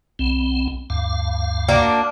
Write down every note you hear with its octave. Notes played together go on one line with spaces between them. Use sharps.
B1 C4
D2 G2 F5
A#3 D4 F#4